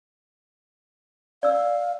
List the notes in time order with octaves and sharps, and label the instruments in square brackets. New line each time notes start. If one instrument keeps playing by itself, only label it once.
[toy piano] D5 E6 [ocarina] F5